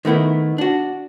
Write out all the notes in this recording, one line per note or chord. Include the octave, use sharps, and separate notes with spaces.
D#3 A3 B3 E4
D4 F#4